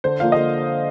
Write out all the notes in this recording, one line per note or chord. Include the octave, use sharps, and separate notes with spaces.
D3 C5
F3 A#3 D4 F5
D3 D#5